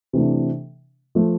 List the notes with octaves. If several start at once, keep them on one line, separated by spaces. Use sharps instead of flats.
C3 E3 A3 D4
F3 A3